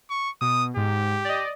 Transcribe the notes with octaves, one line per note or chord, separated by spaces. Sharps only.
C#6
B2 D#6
G#2 G4
D5 D#5